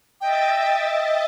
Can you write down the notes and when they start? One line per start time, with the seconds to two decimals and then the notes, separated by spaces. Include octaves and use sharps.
0.21 D#5 E5 G5 A6